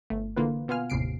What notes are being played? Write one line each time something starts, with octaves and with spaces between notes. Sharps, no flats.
G1 A3
D3 E3 A#3 F4 B4
B2 B3 F4 F5 G#5 F6
G1 D#2 A2 C3 C7 D7